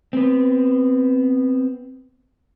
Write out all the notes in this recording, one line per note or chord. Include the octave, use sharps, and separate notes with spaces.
B3 C4